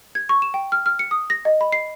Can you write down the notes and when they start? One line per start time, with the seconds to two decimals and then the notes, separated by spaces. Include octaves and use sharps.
0.15 G#6
0.29 C#6
0.42 E7
0.54 G5
0.72 F6
0.86 F6
0.99 C#7
1.11 D#6
1.30 A#6
1.45 D#5
1.61 B5
1.73 C7